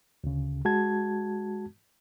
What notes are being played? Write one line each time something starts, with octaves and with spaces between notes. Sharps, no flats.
D2 C#3
G#3 F#4 A5 G#6